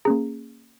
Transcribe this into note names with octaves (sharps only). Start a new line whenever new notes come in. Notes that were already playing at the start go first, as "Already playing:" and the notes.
A#3 C#4 G#4 A#5